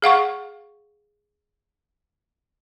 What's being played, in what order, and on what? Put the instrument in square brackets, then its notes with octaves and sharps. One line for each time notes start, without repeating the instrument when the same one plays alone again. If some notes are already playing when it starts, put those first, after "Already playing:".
[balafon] G#4 F5 F#5 C#6